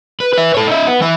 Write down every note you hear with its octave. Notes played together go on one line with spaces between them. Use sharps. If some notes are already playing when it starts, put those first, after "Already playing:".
B4
B4 E5
A4 C#5
D#4 E5
B3
E3 E5